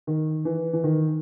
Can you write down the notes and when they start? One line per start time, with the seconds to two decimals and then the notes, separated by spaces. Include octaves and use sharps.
0.07 D#3
0.45 E3
0.73 E3
0.84 D#3